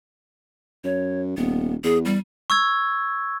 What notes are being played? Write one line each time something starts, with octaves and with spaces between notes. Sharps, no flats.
F#2 C#5
D#1 B3
E2 G#4
G3
C#6 E6 G#6